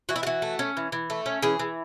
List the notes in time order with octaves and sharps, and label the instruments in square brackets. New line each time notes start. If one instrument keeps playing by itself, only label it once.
[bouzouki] E3 F#4
E4
E3 F#4
A3
C#4
E3
E3
A3
C#4
E3 G#4
E3